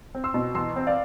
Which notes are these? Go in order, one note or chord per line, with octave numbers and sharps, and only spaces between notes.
C4
C6 E6
B2
E2 C6 E6
C4
D5 F5